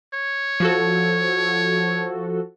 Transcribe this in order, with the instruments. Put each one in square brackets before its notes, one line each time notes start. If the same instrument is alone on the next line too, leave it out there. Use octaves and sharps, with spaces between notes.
[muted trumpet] C#5
[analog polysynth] F3 F#4 A4